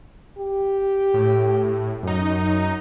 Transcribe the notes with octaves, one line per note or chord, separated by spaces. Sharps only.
G4
A2
F#2 D#4